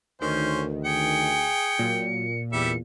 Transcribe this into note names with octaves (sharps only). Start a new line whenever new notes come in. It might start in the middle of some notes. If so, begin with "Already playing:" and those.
D2 D#3 C#4 C5
G#4 G5 C#7
A#2 F#3
E2 G3 E5 C#7